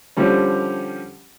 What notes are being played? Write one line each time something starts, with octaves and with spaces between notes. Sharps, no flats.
D3 F3 G3 C#4